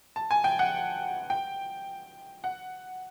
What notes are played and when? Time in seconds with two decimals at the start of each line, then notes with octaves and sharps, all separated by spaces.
0.16 A5
0.31 G#5
0.44 G5
0.59 F#5
1.30 G5
2.44 F#5